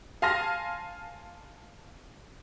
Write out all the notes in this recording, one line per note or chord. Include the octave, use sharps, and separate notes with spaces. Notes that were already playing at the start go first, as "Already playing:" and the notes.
F5 G#5 A5 C6 F6 A#6